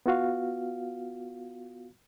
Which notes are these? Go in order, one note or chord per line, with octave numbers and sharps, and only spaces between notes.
B3 F4 F#4 F5